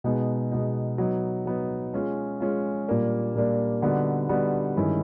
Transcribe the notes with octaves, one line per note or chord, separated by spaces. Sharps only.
B2 G#3 B3 D#4
B2 G#3 B3 D#4
F#3 B3 D#4
F#3 B3 D#4
G#3 C#4 F4
G#3 C#4 F4
A#2 G3 A#3 D4
A#2 G3 A#3 D4
D3 G3 B3 D#4 F#4
D3 G3 B3 D#4 F#4
G2 D#3 G#3 C#4 E4